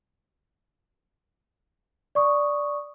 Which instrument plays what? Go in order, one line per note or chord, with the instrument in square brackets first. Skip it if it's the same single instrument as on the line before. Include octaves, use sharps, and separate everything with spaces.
[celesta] D5 C#6 D#6